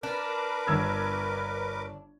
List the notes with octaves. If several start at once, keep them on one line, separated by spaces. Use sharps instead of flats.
D4 A#4 B4 D6
G1 E6 G#6